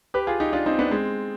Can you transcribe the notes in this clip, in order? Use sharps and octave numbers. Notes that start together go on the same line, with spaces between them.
G4 B4
F4 G#4
D#4 G4
D4 F4
C4 D#4
B3 D4
G#3 C4